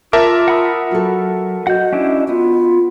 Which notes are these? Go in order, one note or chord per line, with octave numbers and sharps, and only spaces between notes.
F4 A#4 E5 A5 D6
F#5 B5 D#6
F#3 F#4 A4
F#4 D#5 F#5 G6
C#4 D4 E4
B3 F4